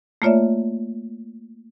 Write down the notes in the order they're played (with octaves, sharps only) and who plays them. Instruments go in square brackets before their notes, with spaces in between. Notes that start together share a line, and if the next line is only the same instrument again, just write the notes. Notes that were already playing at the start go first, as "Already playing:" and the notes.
[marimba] A3 A#3 F4 C#5 D5 E5